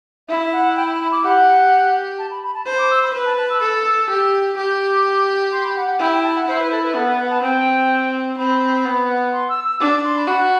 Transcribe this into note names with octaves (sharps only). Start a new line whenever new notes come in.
E4 E5
F#5
G5
B5
D6
G4 F#5
A5
B5
B5
A5
C5 B5
D6
E6
B5
B4
A5
A5
E6
A4 E6
G4
G4 D6
C6
B5
F#5
F#5
E4 G5
G5
A5
F#5
E4 C5
B4
A4
B4
B3 A4
B4
F#5
A5
C4 G5
C4 B5
B3
C6
E6
E6
D4 D6
D6
C6
B5
F#4 B5